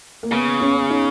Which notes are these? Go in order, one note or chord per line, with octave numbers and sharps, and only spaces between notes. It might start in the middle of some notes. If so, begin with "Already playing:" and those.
A#3
C#3 B3
C#4
D#4